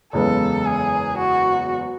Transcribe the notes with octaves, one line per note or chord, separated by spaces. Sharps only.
F#1 E2 C#3 G#3 B3 A4
G#4
F#4